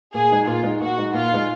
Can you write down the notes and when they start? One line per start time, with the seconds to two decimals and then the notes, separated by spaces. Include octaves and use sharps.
0.14 A#2 G#4
0.31 G#3 D#4
0.47 A#2 F4
0.63 G#3 D#4
0.80 A#2 F#4
0.97 G#3 D#4
1.14 A#2 F4
1.31 G#3 D#4